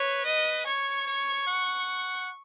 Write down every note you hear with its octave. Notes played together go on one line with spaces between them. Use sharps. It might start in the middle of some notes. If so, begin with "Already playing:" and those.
Already playing: B4 C#5
D#5
C#5 C#6
C#5
F#5